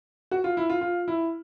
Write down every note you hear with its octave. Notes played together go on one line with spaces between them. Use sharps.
F#4
F4
E4
F4
F4
E4